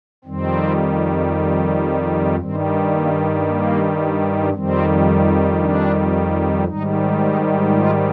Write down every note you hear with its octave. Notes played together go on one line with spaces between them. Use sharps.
F2 D#3 G3 C4
G2 D#3 G3 C4
A#3
A#3
F2 D#3 G3 C4
D4
G#2 D#3 G3 D#4
D#4
F4